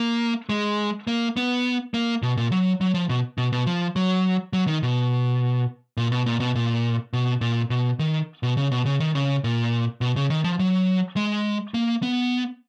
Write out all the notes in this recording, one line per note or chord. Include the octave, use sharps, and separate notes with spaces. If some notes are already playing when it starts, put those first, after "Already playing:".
Already playing: A#3
G#3
A#3
B3
A#3
B2
A#2
F#3
F#3
F3
B2
B2
B2
F3
F#3
F#3
D#3
B2
A#2
B2
A#2
B2
A#2
B2
A#2
B2
D#3
B2
C#3
B2
C#3
D#3
C#3
A#2
B2
C#3
D#3
F3
F#3
G#3
A#3
B3